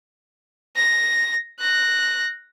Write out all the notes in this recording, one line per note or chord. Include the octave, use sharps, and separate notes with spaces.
A#6
F#6 A#6